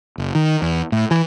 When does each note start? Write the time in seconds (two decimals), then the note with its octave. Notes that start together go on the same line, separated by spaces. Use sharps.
0.18 F#1
0.35 D#3
0.62 E2
0.92 A2
1.11 E3